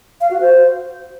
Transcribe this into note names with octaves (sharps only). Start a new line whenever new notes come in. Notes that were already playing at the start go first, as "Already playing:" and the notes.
F5
F#4
C5